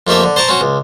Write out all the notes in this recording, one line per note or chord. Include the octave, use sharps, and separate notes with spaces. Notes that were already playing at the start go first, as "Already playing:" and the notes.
F2 A3 A#3 G4 E5
D3
C5 A5 A#5 C#6 D6
C4 C#4 F#4
C#2